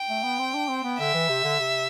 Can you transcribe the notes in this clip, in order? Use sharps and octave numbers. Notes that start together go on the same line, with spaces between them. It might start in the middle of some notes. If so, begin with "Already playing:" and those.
Already playing: G5
A3
B3
C4
D4
C4
B3
D3 E5
E3
C3
D3
C3